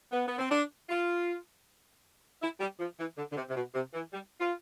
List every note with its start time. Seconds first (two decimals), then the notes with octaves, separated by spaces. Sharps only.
0.12 B3
0.27 B3
0.38 C4
0.50 D4
0.89 F4
2.42 E4
2.60 G3
2.79 F3
2.99 E3
3.17 D3
3.32 D3
3.37 C3
3.49 C3
3.56 B2
3.74 C3
3.94 E3
4.13 G3
4.40 F4